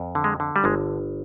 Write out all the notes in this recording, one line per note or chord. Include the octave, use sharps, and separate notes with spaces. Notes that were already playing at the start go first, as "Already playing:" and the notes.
Already playing: F2
D3
G#3
D3
G3
G1 G#3